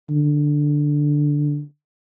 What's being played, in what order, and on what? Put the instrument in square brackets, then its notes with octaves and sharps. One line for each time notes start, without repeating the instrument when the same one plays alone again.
[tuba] D3